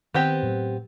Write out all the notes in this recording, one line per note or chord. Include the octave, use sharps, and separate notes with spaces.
D#3 B3 C4 G4
A2 F#3